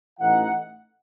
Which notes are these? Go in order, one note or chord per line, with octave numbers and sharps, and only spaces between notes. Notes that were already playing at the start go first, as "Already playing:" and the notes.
A1 A2 E3 A3 D#4 F#5